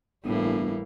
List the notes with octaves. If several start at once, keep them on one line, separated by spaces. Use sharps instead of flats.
G1 A2 E3 G3 A#3